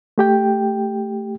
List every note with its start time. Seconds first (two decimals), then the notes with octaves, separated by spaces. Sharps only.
0.18 A3 G4 G5